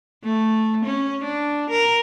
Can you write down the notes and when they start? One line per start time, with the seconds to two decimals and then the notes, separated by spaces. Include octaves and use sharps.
0.24 A3
0.85 C#4
1.24 D4
1.70 A#4